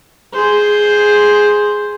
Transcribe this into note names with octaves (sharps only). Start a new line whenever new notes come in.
G#4 C5